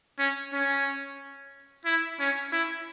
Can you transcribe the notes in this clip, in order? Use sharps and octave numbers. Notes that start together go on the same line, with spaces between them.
C#4
C#4
E4
C#4
E4